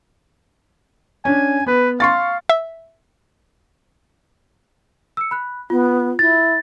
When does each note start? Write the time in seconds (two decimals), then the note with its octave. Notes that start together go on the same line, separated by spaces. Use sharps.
1.25 C#4 D4 G#5
1.66 B3 B4
2.00 F5 C6 C#6 A6
2.49 E5
5.17 E6 C#7
5.31 B5 F#6
5.70 B3 F4
6.19 E4 A6